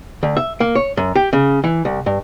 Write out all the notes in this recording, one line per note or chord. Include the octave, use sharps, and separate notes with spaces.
D2
E5
A#3
C#5
F#2
G4
C#3
E3
C2
G2